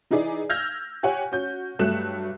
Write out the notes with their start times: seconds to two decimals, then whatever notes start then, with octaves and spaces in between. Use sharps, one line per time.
0.10 E3 D#4 E4 G#4 D5 D#5
0.49 E6 F6 G6 G#6 A#6 F7
1.03 G4 C#5 F#5 G#5
1.32 C#4 F#4 G6
1.79 G2 F#3 G3 A3 F#6 E7